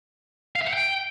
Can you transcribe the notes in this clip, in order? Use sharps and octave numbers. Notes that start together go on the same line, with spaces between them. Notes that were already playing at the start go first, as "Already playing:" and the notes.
F5
E5
F#5
G5